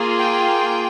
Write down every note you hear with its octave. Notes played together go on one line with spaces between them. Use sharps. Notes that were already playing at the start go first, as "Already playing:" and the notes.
Already playing: A#3 F4 G#4
G5